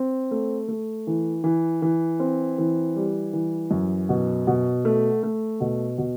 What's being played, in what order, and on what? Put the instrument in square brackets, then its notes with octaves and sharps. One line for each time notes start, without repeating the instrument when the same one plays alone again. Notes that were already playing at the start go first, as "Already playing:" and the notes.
Already playing: [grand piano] C4
A3
A3
E3
E3
E3
C4
E3
G3
E3
F#2
B2
B2
A3
A3
B2
B2